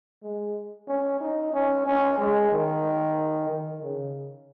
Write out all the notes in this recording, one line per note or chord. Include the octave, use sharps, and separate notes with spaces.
G#3
C#4
D#4
C#4
C#4
G#3
D#3
D#3
C#3